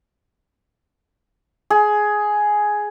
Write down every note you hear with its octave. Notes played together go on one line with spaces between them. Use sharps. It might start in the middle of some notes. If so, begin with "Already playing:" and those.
G#4